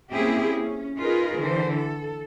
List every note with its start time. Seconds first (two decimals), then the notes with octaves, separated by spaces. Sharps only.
0.12 A#3 C4 C#4 E4 G4 G#4
0.61 C#4
1.01 D#4 F4 G#4 A#4 B4
1.41 D3 E3 C5
1.75 A4